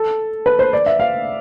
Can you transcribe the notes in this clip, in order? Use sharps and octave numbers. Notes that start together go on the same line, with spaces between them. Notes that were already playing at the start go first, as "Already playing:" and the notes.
Already playing: A4
B4
C5
D5
E5
F5